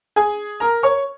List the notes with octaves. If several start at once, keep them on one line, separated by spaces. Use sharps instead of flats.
G#4 G#5
A#4 A#5
C#5 C#6